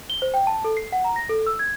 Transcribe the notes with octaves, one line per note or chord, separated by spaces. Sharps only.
G7
C5
G5
A5
A4
C7
F#5
A#5
A#6
A4
E6
G#6